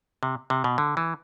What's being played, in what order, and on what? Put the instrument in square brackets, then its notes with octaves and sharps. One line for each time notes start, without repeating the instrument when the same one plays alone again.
[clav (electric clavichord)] C3
C3
B2
D3
E3